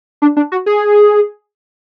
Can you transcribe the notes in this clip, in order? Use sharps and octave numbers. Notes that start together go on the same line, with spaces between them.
D4
D4
F#4
G#4